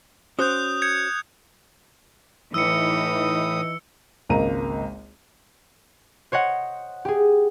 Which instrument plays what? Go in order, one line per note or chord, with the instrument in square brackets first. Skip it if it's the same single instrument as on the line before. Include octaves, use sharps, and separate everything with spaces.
[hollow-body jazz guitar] C#4 F#4 C5 [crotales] D#6 F#6 G6
[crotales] G6 G#6 C#7
[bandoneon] A2 D#6 [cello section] E3 D#4 [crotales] E6 C#7
[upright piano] G#1 C#2 A#3 A#5 D#7
[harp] C5 C#5 D#5 F#5
G4 G#4